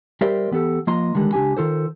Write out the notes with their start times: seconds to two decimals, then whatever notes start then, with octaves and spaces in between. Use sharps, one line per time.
0.21 G3 G4 A#4 C5 D5 E5
0.51 E3 B3 G4 A4
0.87 F3 A#3 F4 D#5 A#5 C6
1.15 D3 D#3 G3 G#3
1.33 C#2 F3 D4 G4 G#5
1.57 D#3 F4 A4 C5